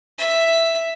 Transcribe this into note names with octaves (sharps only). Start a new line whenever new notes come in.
E5